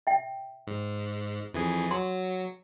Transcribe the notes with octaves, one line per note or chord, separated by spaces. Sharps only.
E5 G5
G#2
F2 E3 G#4
F#3 C6 C#6